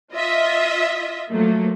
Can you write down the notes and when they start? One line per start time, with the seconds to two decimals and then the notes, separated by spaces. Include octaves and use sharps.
0.13 F4 D#5 E5
1.30 F3 F#3 A3 A#3